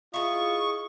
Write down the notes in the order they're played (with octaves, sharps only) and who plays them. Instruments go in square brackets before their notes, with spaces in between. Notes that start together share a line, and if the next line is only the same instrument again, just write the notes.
[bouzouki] E4 G#4 [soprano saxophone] F4 [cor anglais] D#5 [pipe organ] C#6